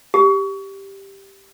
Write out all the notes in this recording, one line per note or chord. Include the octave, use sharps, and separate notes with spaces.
G4